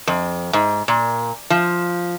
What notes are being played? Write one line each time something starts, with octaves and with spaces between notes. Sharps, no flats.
F2
G#2
A#2
F3